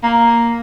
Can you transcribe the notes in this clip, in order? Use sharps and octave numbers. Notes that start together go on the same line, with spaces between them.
A#3